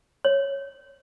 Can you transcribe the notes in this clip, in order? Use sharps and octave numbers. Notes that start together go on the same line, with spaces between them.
C#5